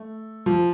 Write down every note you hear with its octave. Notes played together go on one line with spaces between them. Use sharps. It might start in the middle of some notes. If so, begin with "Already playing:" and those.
Already playing: A3
F3